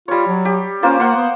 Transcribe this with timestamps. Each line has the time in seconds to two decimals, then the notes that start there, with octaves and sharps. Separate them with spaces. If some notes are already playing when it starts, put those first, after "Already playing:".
0.08 G3 F4 C#5
0.27 F#3
0.45 G4
0.83 A#3 C#4 F4 C5
1.00 A#3 C5 F#5
1.16 B3